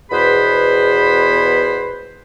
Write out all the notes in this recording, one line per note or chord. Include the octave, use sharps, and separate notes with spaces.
E2 B2 G#4 B4 C5 B5